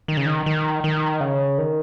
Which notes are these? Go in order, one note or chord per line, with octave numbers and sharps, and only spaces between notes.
D#3
C#3
D#3
D#3
D#3
C#3
D#3